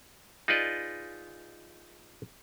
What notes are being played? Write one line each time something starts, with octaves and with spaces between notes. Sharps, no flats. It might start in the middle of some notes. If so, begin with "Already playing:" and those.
D#4 F4 G#4 B4 D5 D#5